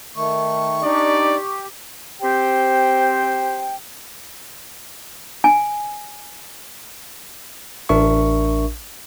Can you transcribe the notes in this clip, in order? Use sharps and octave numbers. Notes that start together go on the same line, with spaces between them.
D#3 A3 C#6
D4 D#4 G4 D5
C4 G4 C5 G5
G#5
A1 D4 A#4 E5 C#6